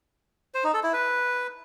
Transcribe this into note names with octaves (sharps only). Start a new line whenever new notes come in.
C5
D#4
A4
E4
B4